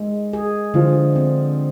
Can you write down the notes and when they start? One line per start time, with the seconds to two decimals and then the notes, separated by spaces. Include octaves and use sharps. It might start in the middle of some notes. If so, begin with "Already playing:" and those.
Already playing: G#3
0.33 G#4
0.74 D3 F3
1.16 C4